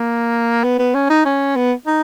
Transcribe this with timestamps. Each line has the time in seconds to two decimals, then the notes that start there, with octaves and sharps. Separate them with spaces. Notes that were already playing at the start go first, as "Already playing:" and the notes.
Already playing: A#3
0.64 B3
0.79 B3
0.94 C#4
1.10 D#4
1.25 C#4
1.56 B3
1.87 D#4